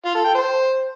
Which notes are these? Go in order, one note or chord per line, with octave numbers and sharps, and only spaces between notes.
F4
A4
G5
C5